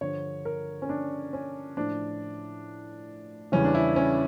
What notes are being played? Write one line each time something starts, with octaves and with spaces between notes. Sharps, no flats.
G2 D3 F3 C#5
A#4
C#4
D4
C#4
A2 F3 D4
E2 C#3 E3 G3 C#4
D4
E4
C#4